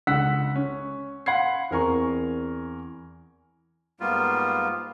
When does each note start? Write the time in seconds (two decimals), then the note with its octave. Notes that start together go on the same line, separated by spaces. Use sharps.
0.07 C#2 D3 F#5 E6 F#6 B6
0.56 C#4
1.26 F5 F#5 B5 C6 G#6 C7
1.71 E2 C4 A#4 G#5 A#5 C#6
4.00 G#2 G3 A#3 B3 F4